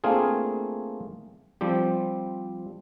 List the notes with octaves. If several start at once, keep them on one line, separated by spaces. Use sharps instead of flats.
A3 A#3 C4 D4 F4 G#4
F3 G3 C4 G4